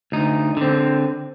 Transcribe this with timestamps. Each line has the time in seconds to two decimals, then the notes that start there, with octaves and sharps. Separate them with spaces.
0.12 D2 D#4
0.57 D3 C4